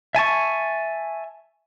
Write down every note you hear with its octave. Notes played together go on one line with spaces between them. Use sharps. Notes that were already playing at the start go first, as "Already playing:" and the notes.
E5 G#5 A5 C#6